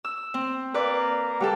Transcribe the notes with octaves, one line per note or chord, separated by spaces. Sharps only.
E6
C4
A#3 B4 D5
G3 G4 A4 F#5